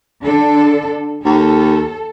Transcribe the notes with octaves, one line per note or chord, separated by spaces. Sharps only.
D3 D4 A4
D#2 A4